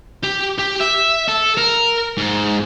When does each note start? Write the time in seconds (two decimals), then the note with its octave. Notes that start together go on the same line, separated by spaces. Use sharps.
0.23 G4
0.58 G4
0.80 E5
1.28 A4
1.57 A#4
2.17 G#2